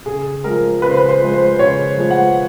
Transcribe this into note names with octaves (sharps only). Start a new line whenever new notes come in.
C#3 G#4
F3 G#3 A#4
C#3 B4
C5
B4
C5
F3 G#3
C5
C#3 C#5
F3 G#3
F#5